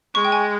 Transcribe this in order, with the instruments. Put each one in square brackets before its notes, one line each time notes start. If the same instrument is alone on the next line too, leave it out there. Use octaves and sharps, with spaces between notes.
[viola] G#3 [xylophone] C#6
[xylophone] G5
G#5